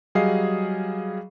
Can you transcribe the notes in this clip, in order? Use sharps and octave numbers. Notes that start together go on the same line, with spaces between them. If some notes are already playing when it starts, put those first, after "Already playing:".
F#3 G3 G#4 D#5 F5 C7